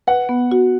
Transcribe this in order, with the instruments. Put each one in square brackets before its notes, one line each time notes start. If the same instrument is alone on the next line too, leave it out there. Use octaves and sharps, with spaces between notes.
[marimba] B4 [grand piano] F#5
[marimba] B3
F#4